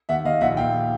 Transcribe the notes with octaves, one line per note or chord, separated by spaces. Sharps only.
D#2 E5 F#5
D#2 D#5 F5
A#1 E5 F#5
A#1 F5 G5